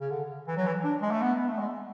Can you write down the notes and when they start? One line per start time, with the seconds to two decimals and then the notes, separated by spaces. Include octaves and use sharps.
0.01 C#3
0.10 D3
0.47 E3
0.57 F#3
0.67 E3
0.84 D4
1.02 G#3
1.11 A3
1.22 B3
1.38 B3
1.48 A3
1.59 G#3